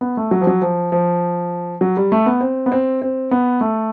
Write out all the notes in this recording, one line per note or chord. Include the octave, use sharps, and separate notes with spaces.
B3
A3
F#3
F3
F#3
F3
F3
F#3
G3
A3
B3
C4
B3
C4
C4
B3
A3